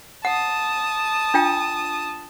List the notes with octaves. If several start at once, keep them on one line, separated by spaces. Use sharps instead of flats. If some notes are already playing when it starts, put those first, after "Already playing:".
F#5 A5 D#6
D4 F4 G5